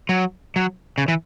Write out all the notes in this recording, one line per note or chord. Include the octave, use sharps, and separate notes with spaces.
F#3
F#3
C#3
E3